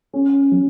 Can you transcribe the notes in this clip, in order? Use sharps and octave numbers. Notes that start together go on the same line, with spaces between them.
C#4
F#3